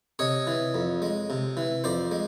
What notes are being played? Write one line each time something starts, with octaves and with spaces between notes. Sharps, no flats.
C3 C#5 D#5
E3
F2
G#3
C3
E3
F2 C5 D5
G#3